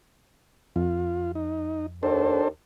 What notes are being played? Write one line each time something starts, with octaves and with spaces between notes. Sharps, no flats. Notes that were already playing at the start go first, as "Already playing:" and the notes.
F2 F4
D#4
D#2 D4 A4 C5